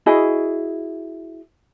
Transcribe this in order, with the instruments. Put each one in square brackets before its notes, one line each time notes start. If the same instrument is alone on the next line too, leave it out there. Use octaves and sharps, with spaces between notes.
[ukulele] E4 F#4 G#4 D#5